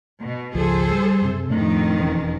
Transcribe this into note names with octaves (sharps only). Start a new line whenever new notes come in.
B2
G#1 C#2 F3 G#4 A4 C5
G3
F#2 C3
F2 A2 D#3 A3 D4
E1 E3 C#4